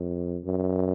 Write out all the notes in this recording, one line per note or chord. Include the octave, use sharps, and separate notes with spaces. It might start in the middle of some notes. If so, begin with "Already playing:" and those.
Already playing: F2
F#2